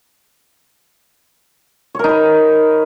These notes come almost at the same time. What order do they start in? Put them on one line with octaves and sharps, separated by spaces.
C#5 A#4 D#4 B4